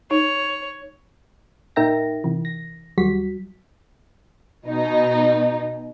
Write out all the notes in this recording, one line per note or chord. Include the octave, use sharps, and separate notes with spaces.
D#4 C#5
A#2 D#4 A#4 E5 G5 A#6
C3 E3
A#6
D#2 F#3 G3 F#4 B6
B2 D#4